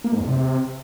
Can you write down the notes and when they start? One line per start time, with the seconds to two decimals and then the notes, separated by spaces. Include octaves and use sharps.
0.04 A#3
0.12 G#2
0.20 E2
0.27 C3